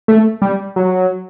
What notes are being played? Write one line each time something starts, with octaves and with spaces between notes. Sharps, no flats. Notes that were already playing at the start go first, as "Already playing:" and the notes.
A3
G3
F#3